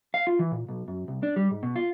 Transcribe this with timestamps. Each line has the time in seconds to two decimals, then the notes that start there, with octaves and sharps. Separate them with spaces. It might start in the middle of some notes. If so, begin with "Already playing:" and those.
0.14 F5
0.27 F4
0.39 E3
0.52 A#2
0.69 B1
0.88 F#2
1.08 C2
1.23 D4
1.36 G3
1.51 G#2
1.63 B2
1.76 F4